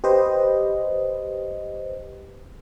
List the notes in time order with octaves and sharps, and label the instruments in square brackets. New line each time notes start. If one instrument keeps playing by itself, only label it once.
[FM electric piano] G4 B4 C5 D#5